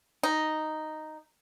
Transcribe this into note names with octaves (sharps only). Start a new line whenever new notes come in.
D#4